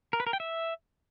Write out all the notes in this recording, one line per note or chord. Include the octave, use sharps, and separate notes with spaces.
A#4
B4
A#4
G5
E5